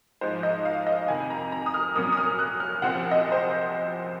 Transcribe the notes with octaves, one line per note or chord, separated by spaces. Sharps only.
G#2 F3 G#3 C5
D#5
F5
D#5
F2 C3 D#3 G#5
A#5
A#5
D#6
F6
A#2 F#3 A#3 C#4 D#6
D#6
F6
F#6
F6
C2 A#2 F3 C4 F#5
D#5
C5